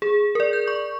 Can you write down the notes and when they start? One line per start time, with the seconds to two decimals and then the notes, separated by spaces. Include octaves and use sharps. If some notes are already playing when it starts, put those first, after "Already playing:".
0.02 G#4
0.35 A#4 D5
0.53 G6
0.68 C#6